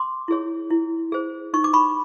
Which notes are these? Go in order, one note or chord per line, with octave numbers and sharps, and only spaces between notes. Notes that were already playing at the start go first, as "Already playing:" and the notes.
Already playing: C6 D6
E4 G#4 C#5
E4
G#4 C5
D#4 C#6
D6
B5 C#6